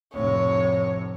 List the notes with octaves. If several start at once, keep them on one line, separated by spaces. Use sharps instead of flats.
F1 A2 C#5